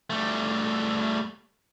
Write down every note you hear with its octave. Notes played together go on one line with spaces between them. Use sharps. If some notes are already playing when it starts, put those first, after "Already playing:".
G3 A3